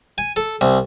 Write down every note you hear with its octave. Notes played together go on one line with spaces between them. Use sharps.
G#5
A4
C2